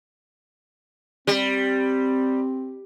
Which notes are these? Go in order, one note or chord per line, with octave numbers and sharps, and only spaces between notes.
G3 C4